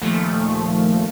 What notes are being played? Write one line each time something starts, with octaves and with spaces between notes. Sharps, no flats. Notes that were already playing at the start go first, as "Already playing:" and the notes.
D#2 A#2 F3 A3